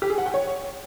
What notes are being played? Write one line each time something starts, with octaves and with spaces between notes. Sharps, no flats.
G4
G#4
F#5
G5
C#5